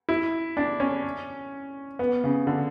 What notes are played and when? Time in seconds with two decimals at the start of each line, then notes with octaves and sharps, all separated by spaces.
0.09 E4
0.57 D4
0.80 C#4
1.99 B3
2.24 C#3
2.47 D3